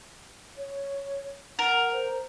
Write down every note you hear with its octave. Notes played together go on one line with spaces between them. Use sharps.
C#5
A#4 F#5
C5